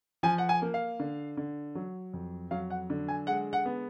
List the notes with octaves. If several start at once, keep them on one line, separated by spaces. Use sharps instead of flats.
F3 G#5
F#5
G#5
A#3
F5
D3
D3
F#3
F2
F#3 F5
F#5
D3
G#5
G#3 F#5
F#5
B3